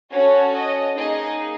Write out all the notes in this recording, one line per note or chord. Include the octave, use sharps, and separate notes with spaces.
C#4 F#4 A4 C#5
D#5
A#3 D#4 G#4 D#5